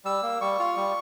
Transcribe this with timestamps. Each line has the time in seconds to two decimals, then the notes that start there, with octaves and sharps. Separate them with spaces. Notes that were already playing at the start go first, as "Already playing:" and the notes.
0.05 G3 E6
0.23 A#3
0.41 G3 C#6
0.59 F4
0.77 G3